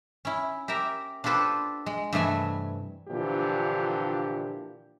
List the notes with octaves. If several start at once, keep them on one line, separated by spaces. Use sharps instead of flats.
C#4 E4
G4 A#4 E5 A#5
D4 F4 G4 A4 B4 C5
G#3
G2 C3 E3 A3 E5 G#5
A#2 D3 E3 F3 D4 G4